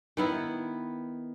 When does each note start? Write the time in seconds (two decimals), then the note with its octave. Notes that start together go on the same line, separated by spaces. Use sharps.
0.17 D#3 B3 E4